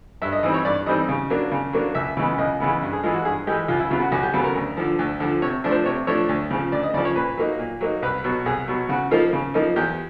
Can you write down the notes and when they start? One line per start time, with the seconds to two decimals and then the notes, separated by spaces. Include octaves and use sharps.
0.22 G2 E5
0.32 D#5
0.43 E3 G3 C4 D#4 D#5
0.54 C#5
0.65 G2 D5
0.86 E3 G3 C4 D#4 D#5
1.09 C#3
1.30 F#3 A#3 D4
1.52 C#3
1.73 F#3 A#3 D4
1.95 C#2 E5
2.17 C#3 E3 G#3 B3
2.38 C#2 D#5
2.60 C#3 E3 G#3 B3
2.82 G2
2.93 G#4
3.03 E3 G#3 F4
3.14 F#4
3.25 G2 G#4
3.47 E3 G#3 G4
3.68 C#2 F4
3.79 E4
3.90 C#3 F#3 B3 F4
4.01 F#4
4.12 C#2 F#4
4.23 G4
4.34 C#3 F#3 B3 A4
4.44 A#4
4.56 D2
4.77 D3 F3
4.99 D2
5.20 D3 F3
5.42 C3 C#5
5.64 F3 A3 D4
5.71 C5
5.85 C3 C#5
6.07 F3 A3 D4 C#5
6.29 D2
6.50 C#3 F3
6.72 D2 D5
6.83 D#5
6.94 C#3 D5
6.98 F3
7.05 C#5
7.16 A#2 B4
7.38 F#3 A#3 D#4
7.59 A#2
7.81 F#3 A#3 D#4
8.02 C2 B4
8.24 B2 F#3
8.46 C2 G#4
8.68 B2 F#3
8.89 C#3 F#4
9.11 F3 A#3 D#4 F4
9.33 C#3
9.54 F3 A#3 D#4
9.76 E2 G4